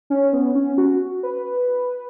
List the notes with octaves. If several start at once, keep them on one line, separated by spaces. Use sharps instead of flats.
C#4
B3
C#4
F#4
B4